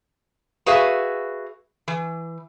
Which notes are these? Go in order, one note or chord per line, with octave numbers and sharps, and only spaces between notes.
F#4 G#4 B4 E5 F5
E3